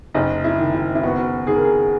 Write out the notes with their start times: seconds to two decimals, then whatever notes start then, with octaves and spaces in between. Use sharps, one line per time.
0.15 F#1 D#4
0.44 E4
0.58 D#3
0.74 E4
0.95 E4
1.03 B3 F#4
1.47 D#3 G#4
1.55 A#4
1.64 G#4